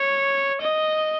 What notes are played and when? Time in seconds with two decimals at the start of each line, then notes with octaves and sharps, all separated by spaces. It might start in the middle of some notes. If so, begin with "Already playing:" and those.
Already playing: C#5
0.61 D#5